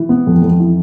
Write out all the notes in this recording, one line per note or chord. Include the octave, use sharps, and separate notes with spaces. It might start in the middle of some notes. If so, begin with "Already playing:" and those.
Already playing: E3
B3
F2
F2
E3